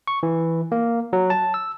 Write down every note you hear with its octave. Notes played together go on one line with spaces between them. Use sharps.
C#6
E3
A#3
F#3
A5
E6